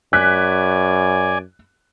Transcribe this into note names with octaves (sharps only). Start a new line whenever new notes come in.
F#2 D5 G#5 F#6 B6